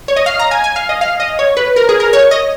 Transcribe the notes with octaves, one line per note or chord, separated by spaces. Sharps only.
C#5
D#5
F5
A#5
G#5
G#5
F5
D#5
F5
D#5
C#5
B4
A#4
G#4
A#4
C#5
D#5